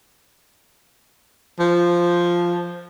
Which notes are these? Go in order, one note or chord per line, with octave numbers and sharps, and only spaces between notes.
F3